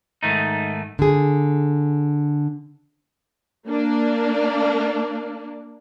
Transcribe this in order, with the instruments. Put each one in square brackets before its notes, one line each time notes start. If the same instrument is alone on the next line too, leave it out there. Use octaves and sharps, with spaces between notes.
[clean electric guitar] G#2 D#3 A3 D#4
[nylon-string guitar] D3 G#4
[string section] A#3 D4